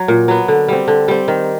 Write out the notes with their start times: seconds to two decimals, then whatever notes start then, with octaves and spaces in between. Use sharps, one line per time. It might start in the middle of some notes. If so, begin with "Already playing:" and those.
Already playing: F#3
0.08 A#2
0.28 F#3 B3
0.48 D3
0.68 G3 C4
0.88 D3
1.08 G3 C4
1.28 D#3